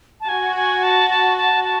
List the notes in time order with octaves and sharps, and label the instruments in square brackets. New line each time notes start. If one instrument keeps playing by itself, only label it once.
[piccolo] A5
[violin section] F#4 [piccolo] G#5
[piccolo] G#5
A5
A5
A5
A5